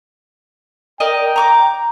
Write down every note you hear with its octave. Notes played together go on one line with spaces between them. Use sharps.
A#4 D5 D#5 G5
A#5 C#6 D6